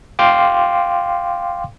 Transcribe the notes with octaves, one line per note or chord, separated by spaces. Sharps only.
F5 G5 C6 D6